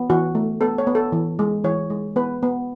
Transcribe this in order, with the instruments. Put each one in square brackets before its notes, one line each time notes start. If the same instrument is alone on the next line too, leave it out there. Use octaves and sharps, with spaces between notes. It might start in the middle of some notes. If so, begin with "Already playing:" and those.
Already playing: [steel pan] B3
E3 F#4
A3
B3 A4
C#5
B3
A4
E3
G#3
E3 C#5
G#3
B3 B4
B3